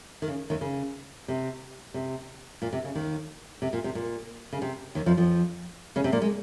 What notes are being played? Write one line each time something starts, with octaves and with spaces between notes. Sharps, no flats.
D#3
C#3
D#2 D#3
C#3
C3
C3
A#2
C3
C#3
D#2 D#3
C3
A#2
C3
A#2
C#3
C3
D#2 D#3
F2 F3
F2 F3
C#3 C#4
C3 C4
A#2 A#3
G#3